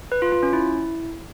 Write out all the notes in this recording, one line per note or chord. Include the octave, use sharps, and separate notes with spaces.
B4
F4
F4
C#4
E4